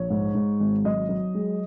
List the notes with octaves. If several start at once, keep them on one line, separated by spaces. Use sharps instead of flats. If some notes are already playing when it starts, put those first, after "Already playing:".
Already playing: A#1 C#5
G#2
G#2
G#1
F#3 D#5
F#3
G#3